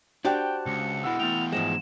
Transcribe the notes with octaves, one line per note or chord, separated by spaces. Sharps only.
D4 F#4 G4 C5 G5 A5 F#6
C#2 C#7
B2 G#3 E4 F#5 E6
E2 A3 B3 G5 F7
G#2 F3 G#3 E7